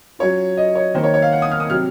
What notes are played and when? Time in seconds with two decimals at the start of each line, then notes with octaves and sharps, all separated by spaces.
0.19 F#3 C#4 F4 C#5
0.57 D#5
0.75 C#5
0.95 D#3 A#3 D#4 C5
1.04 C#5
1.14 C#5
1.22 F5
1.33 F#5
1.42 D#6
1.51 F6
1.60 D#6
1.69 C3 F#3 C4 F6